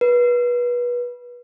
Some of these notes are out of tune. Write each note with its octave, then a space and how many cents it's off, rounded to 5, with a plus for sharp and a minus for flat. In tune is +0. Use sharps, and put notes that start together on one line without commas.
B4 -25